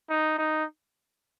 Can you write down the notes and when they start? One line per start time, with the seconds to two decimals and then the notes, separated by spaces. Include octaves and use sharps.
0.10 D#4
0.39 D#4